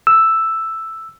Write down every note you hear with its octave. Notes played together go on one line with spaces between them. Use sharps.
E6